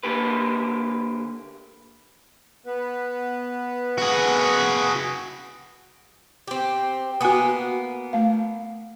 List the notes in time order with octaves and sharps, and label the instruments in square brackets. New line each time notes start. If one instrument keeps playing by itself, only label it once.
[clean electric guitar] D3 A#3 G4 B4
[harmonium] B3 B4
[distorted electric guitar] F#4 G#4
[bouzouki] C4 G4
[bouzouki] A#3 B3 [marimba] F#4 G#5 D#6
[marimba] A3 F5